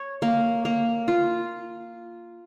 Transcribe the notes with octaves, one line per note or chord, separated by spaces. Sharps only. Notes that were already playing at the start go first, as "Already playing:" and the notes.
Already playing: C#5
A#3
A#3
F4